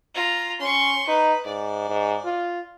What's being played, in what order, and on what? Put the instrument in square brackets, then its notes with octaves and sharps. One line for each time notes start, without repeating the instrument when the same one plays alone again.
[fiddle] F4 A#5
[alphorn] C#4 [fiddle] C6 C#6
[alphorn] D#4 [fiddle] B4
[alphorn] G#2 [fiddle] D5
[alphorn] G#2
F4